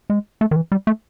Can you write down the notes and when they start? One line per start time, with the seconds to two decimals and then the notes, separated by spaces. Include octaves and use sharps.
0.10 G#3
0.41 A3
0.51 D#3
0.56 E3
0.72 G3
0.87 A3